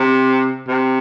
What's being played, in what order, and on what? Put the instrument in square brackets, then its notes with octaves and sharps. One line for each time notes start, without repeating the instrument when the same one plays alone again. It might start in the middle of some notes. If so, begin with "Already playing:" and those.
Already playing: [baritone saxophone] C3
C3